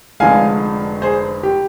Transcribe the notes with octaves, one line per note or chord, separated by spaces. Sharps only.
F1 F2 D3 G#3 F5 G#5
G#4 C5
G4